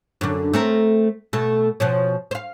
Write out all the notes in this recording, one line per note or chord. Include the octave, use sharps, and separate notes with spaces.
F#2 D3
A3 C4 A#4
B2 A3
B2 F3 C#4
C5 F5